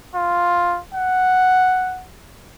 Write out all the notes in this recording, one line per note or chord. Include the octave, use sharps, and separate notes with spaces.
F4
F#5